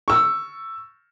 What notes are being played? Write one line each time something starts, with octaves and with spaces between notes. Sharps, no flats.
C#6 E6